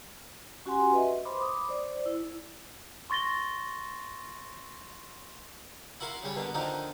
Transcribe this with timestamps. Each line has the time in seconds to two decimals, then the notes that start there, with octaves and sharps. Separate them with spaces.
0.66 C#4 F#4 G4 F#5 G#5 C6
0.93 B4 D#5 E5
1.25 C5 B5 C6 D6
1.40 D6 D#6
1.69 C5 D5
2.06 E4
3.10 C6 C#6 A6 A#6 G7
6.00 E4 F#4 A#4 F5 C6
6.23 C#3 G3 C#5
6.36 B2 D3 A#3
6.54 D3 D#3 F3 A#3 D4 D#4